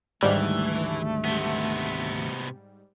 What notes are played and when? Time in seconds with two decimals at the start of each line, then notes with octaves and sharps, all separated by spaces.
0.22 G#1 D2 G#2 E3 G3 A3
1.25 C3 B3